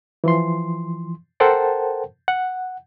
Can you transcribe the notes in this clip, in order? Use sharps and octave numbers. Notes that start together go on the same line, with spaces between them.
E3 F3 C6
A4 A#4 C5 F#5 G5 A5
F#5